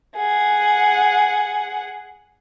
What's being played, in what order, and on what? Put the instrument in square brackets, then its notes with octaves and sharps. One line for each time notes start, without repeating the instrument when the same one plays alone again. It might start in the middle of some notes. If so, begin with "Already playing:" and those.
[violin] G#4 F#5